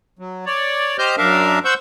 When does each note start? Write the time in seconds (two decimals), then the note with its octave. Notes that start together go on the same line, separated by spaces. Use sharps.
0.19 F#3
0.46 C#5 D5
0.98 G4 C5 D#5 F6 G6
1.18 F#2 D4 A#4 E5 F5
1.65 C5 F#5 C#6 E6 G6